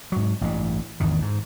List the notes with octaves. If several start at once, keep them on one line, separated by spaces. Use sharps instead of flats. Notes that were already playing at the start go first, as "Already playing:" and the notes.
G#2 F#3
A1 G2
G#1 E2 G2 D#3
G#2